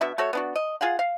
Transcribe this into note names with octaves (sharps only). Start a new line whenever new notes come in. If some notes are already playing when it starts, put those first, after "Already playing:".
B2 D4 E5
A3 F#4 A4 C#5
B3 D4 F#4
D#5
F4 G#4 F5 F#5
F5